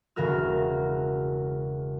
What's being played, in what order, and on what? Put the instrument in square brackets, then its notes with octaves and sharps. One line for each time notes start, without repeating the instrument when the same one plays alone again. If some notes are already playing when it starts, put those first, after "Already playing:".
[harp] E1 C#3 F#4 A#4 F6